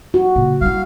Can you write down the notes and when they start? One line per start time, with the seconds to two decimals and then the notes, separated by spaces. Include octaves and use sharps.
0.14 F#4
0.36 A#2 C#3
0.61 G3 E4 F5